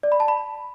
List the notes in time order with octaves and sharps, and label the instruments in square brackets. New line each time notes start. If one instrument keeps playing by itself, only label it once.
[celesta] D5
B5
A5
B5